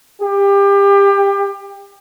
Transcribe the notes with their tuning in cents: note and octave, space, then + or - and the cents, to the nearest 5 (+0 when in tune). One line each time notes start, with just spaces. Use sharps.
G4 +25